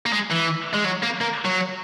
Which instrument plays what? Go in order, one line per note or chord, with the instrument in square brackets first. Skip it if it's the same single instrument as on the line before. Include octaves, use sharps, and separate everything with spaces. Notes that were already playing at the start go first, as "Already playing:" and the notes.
[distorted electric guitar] A#3
G#3
E3
G#3
F#3
A#3
A#3
F#3